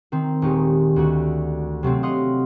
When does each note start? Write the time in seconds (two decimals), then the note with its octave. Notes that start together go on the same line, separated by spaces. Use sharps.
0.12 D#3 C4
0.42 D#1 G#3 D#4 G4 C#6
0.96 D2 F#4
1.83 C3 F#3 A3 C4
2.03 D#5 F5 F#5 C6 D#6